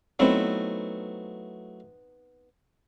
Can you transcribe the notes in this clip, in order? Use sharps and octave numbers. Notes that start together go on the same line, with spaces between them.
F#3 A3 B3 C4 D#4 E4